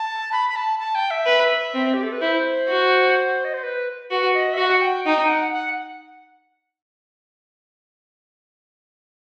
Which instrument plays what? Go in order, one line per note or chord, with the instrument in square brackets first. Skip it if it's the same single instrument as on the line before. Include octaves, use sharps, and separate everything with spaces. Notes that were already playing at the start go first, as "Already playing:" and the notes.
Already playing: [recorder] A5
B5
B5
A5
A5
G5
E5
[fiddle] B4
C4
[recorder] G4
A4
B4
[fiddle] E4 [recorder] C5
[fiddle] F#4
[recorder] D#5
C5
B4
[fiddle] F#4 [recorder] B4
[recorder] D#5
E5
[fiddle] F#4 [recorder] F#5
[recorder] G5
[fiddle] D#4 [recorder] G5
[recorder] F#5
F#5